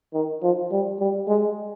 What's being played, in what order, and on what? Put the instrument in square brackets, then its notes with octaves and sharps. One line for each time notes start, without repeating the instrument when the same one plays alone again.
[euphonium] D#3
F3
G3
G3
G#3